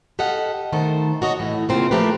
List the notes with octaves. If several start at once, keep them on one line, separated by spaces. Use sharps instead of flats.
G4 A4 D#5 F5 F#5
D#3 A3 A4 C5
F#4 C#5 D#5
A2 E3
A#2 C#3 F3 C4 F4
F3 A3 A#3 G4 A#4 B4